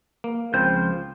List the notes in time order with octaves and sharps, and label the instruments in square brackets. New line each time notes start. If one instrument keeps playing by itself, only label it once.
[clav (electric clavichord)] A#3
[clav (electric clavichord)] C#2 C4 [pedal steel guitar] F3 C5 G6